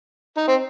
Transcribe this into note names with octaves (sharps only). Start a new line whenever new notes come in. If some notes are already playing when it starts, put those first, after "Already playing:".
D#4
C4